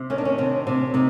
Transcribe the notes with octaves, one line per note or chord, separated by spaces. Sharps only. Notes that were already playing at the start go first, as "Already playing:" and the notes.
Already playing: C3
D#3 C#4
D4
C#4
C3 D4
C3
C3 D#4